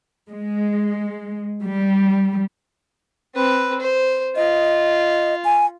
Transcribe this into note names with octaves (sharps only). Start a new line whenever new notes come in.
G#3
G3
C4 B4
C5
F4 D#5
G#5